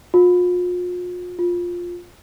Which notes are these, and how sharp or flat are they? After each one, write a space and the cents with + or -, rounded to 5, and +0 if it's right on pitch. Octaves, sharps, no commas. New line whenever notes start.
F4 +40
F4 +10